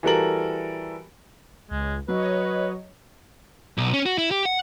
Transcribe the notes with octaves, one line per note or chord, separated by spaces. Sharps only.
E3 G3 F#4 A4 A#4 F#7
C#2 G#3
F#3 B4 C#5 D#5
B1
C#4
F#4
E4
G4
F#5